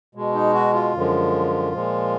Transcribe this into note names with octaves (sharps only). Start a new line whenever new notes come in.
B2 G#3
D#4
F#4
F4
F#2 D3 F3 G#3
A#2 F3 G#3